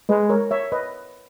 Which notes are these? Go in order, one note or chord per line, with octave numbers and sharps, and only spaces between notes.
G#3 B4 D#5
A#4 C#5
C#5 E5
B4 D#5